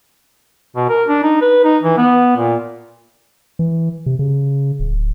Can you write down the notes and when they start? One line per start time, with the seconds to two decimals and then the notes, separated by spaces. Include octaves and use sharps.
0.76 B2
0.89 A#4
1.08 D4
1.23 D#4
1.42 B4
1.64 D#4
1.83 E3
1.98 B3
2.37 A#2
3.59 E3
4.06 C3
4.19 C#3
4.80 D1